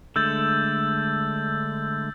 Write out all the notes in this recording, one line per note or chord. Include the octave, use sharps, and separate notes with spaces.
D3 G#3 A3 E6 G6 A6